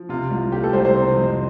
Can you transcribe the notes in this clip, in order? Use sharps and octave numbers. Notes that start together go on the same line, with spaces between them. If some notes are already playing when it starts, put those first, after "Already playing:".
Already playing: F3
C3 F4
C2
A3 G4
A4
C2 C5
C5
C3
F2